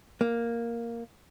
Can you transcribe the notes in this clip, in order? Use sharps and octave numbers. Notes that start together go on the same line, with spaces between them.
A#3